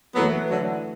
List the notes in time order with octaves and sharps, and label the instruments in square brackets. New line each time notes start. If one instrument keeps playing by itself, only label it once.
[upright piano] E3 A3 E4 B4 [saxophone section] F#3 B3
[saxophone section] D3 F#3